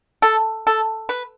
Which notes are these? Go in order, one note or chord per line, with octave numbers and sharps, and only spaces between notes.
A4
A4
B4